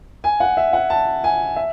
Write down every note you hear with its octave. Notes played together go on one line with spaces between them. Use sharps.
G#5
F#5
E5
F#5
A5
G#5
E5